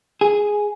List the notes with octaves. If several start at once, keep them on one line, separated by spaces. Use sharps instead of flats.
G#4